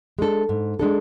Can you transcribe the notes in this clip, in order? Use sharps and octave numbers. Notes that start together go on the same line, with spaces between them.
G#3 D4 A4
G#2
G#3 D4 A4